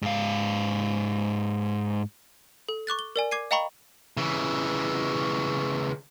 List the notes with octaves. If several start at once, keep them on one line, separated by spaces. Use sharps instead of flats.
G#2 F5
A4
C#6 D6 F#6 A6
G7
A#4 D5 G#5
D6 G#6 C7 D#7
D#5 F5 G5 A#5 B5 C#6
C#3 E3